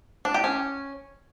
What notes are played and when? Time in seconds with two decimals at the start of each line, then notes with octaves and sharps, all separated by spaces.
0.25 D4
0.34 G4
0.44 C#4